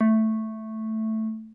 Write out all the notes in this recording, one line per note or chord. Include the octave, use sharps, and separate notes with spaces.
A3